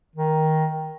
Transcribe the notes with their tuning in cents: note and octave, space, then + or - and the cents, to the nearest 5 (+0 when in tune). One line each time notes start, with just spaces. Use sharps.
D#3 +10